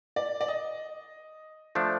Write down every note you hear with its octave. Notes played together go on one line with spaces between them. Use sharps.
D5
D5
D#5
F3 A3 D4